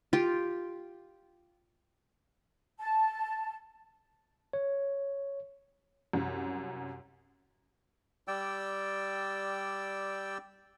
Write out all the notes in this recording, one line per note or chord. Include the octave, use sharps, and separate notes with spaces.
F4 G4
A5
C#5
C2 F#2
G3 D5 G5 E6